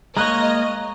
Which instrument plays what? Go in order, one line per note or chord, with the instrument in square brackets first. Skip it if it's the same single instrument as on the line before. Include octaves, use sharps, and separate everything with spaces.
[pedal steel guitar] G#3 A#3 C#5 [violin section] D#5 [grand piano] A#5 F#6